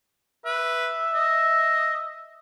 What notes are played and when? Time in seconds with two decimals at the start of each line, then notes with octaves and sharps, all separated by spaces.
0.45 B4 E5
1.14 D#5